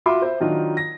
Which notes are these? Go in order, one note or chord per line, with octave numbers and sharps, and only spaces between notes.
F4 F#4 E5 C6 D6
C5 E5
D#3 F#3 D4 D#4 F4
A#6